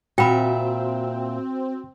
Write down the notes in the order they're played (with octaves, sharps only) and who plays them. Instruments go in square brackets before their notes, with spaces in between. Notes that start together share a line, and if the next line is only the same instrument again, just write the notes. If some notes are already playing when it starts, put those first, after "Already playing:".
[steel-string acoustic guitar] A#2 E5 [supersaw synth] C4 [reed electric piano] F#4 [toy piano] G5 B5